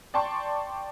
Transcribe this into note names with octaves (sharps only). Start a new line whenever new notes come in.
D5 G5 A5 C6 C#6